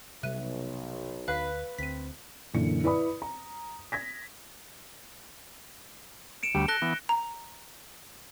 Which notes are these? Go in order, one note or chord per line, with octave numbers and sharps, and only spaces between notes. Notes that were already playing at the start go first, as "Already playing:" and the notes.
B1 C3 G3 E5 F#6 D#7
D2 B4 F5 B6
D2 C4 B6 D#7
F#2 A#2 D3 E3 C#7
E4 B4 D5 B5 D#6
A#5
G#6 A#6 B6
C#7 D7 E7
D2 G3
A4 F#6 A#6 G7
E3 B3
A#5